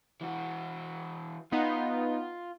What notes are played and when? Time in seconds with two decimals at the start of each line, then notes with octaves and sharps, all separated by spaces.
0.21 E3 F#4
1.52 B3 D#4 F4